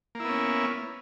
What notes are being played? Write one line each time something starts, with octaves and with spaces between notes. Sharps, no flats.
A#3 B3 C#4 E4